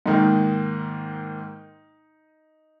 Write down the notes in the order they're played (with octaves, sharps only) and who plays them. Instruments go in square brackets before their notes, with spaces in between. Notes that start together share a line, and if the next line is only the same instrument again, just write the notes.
[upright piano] G#2 D#3 A#3 D#4